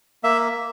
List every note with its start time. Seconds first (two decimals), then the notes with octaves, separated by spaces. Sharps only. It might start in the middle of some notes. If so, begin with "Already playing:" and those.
0.24 A#3 E5